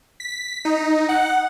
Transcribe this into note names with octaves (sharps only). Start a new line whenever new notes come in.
B6
D#4
F#5